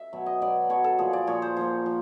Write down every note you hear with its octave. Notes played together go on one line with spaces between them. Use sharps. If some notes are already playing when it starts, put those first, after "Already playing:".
Already playing: E5
B2 F#3
D#5
B2 F#3 D5
B2 F#3 C#5
A4
A#2 F3 G#4
D5
A#2 F3 C#5
C5
A#2 F3 C5
A#2 F3